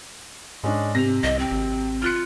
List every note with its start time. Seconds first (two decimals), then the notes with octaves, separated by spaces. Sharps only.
0.64 G#2 G#3 C#4 D4
0.95 C3 A#6 F7
1.23 C2 D#5 A#6
1.39 C4
1.52 G#1
2.02 F4 F6 F#6 C#7